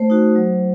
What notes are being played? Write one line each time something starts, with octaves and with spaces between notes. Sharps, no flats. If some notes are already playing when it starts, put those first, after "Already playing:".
Already playing: A3 C5
D#4 F#4
F#3